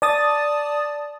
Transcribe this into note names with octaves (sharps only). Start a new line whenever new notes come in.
D5 A5 D#6 A6